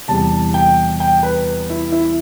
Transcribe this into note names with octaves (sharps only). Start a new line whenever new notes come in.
E2 C3 G3 A5
G5
G5
B4
E4
E4